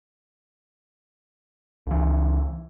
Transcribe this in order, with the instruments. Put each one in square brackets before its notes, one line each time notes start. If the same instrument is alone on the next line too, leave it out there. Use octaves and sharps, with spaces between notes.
[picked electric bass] C#2 E3